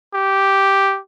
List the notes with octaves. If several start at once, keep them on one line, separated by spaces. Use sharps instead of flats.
G4